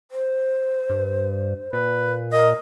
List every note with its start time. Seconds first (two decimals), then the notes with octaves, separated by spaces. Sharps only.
0.11 C5
0.90 G2
1.73 A#2 B4
2.33 A#4 D#5